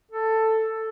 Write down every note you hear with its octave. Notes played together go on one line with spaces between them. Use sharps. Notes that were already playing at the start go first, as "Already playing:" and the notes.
A4